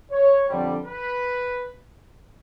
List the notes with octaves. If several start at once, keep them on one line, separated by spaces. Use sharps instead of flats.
C#5
F2 D3 G3
B4